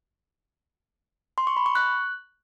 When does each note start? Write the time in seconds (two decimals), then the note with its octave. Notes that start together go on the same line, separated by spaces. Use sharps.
1.38 C6
1.47 C#6
1.57 B5
1.66 C#6
1.75 F#6